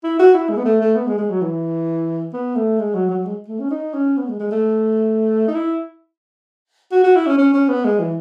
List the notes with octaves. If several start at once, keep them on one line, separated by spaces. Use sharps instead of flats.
E4
F#4
E4
G#3
B3
A3
A3
B3
G#3
G#3
F#3
E3
B3
A3
G#3
F#3
F#3
G#3
A3
C#4
D#4
C#4
B3
G#3
G#3
A3
D#4
E4
F#4
F#4
E4
C#4
C#4
C#4
B3
G#3
E3